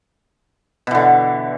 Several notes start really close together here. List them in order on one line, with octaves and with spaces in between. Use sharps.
B2 E3 D3